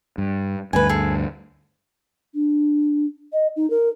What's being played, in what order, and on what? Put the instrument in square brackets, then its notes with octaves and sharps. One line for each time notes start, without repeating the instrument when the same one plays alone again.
[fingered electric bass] G2
[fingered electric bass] D2 G2 [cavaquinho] B4 G#5
[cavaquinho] G#4 A4
[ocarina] D4
D#5
D#4
A#4